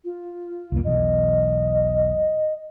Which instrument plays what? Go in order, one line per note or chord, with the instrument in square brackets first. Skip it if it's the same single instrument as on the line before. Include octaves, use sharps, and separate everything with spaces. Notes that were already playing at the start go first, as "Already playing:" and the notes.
[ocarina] F4
[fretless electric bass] C2 F2 A#3
[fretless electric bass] E1 B1 E2 [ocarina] D#5